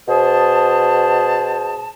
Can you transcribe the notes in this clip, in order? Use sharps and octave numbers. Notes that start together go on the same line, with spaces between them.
B2 G#4 C5 A5